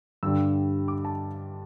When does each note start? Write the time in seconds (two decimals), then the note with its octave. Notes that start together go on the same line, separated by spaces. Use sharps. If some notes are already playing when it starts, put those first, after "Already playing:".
0.23 G2 D3 G3 E6
0.88 D6
1.05 A5